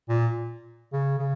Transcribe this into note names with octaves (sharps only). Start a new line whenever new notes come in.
A#2
C#3
C#3